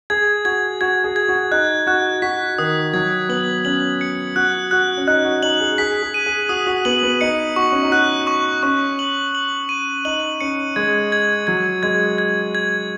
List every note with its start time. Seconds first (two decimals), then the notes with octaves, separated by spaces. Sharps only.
0.10 G#4 G#6
0.45 F#4 G#6
0.81 F#4 G#6
1.04 G#4
1.16 G#6
1.29 F#4
1.51 D#4 F#6
1.87 F#4 F#6
2.22 F#4 B6
2.58 D#3 D#6
2.94 F#3 G#6
3.29 B3 F#7
3.65 C#4 F#7
4.01 C#7
4.36 F#4 F#6
4.71 F#4 F#6
4.97 C#4
5.07 D#4 F#6
5.24 F#4
5.43 D#4 F#7
5.60 G#4
5.78 G#4 B6
6.03 G#4
6.14 D#7
6.26 G#4
6.49 F#4 D#6
6.67 F#4
6.85 B3 F#7
7.03 B3
7.21 D#4 C#7
7.56 F#4 C#6
7.72 C#4
7.83 D#4
7.91 F#4 F#6
8.27 C#6
8.63 C#4 C#6
8.99 F#7
9.35 F#7
9.69 D#7
10.05 D#4 F#7
10.41 C#4 C#7
10.76 G#3 G#6
11.12 G#6
11.47 F#3 G#6
11.83 G#3 G#6
12.18 G#6
12.55 G#6